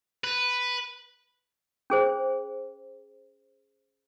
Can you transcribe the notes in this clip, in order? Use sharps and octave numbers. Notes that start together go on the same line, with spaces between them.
B4
C#4 G#4 C5